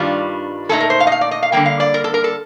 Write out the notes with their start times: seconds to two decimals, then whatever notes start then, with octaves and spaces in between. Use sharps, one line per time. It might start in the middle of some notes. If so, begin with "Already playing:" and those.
Already playing: G2 D#3 G3 D4 F4
0.69 A#2 A3 D#4 A4
0.80 A#4
0.90 C5
1.00 F5
1.07 D#5
1.12 F5
1.21 D5
1.31 D#5
1.43 F5
1.52 D3 G3 A#3 G5
1.66 F5
1.80 D5
1.94 A#4
2.04 A4
2.14 A#4
2.24 A4